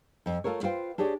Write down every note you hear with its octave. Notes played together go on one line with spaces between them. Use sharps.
F2
A3 F4 A4 A#4 C#5
F4 B4 C5 F5 G5
D4 G4 G#4 C#5 D5